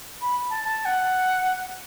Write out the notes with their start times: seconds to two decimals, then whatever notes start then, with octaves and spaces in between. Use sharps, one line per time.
0.21 B5
0.50 A5
0.64 A5
0.85 F#5